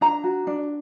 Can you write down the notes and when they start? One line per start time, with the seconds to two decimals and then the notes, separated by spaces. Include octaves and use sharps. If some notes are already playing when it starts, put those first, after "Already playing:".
0.01 D4 A#5
0.24 F#4
0.47 D4